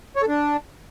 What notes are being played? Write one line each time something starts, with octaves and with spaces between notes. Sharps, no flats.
C#5
A4
D4